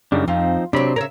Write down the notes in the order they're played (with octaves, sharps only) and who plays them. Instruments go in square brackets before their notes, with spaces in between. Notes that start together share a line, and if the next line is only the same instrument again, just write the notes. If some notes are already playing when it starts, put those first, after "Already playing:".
[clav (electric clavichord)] F#2 C#3 G3 [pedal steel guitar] D4 D#4
[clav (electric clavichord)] F2 [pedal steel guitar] F3 C4 D#4 [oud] F4
[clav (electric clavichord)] C3 [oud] F#3 C4 [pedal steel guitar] D4 B5
[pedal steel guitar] C#3 C#5 A#5 [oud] A#4 E5